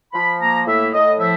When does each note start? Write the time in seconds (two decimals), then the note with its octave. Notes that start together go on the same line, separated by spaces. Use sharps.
0.13 F3 B5
0.39 A#3 A#5
0.66 A2 E5
0.93 A2 D#5
1.19 F3 E5